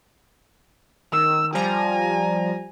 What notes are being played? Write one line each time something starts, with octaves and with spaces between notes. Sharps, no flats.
D#3 E6
F3 G3 G#5 A#5